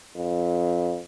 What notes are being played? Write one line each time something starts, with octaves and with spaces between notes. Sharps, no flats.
F2